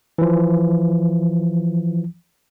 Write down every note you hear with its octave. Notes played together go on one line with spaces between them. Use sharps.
E3 F3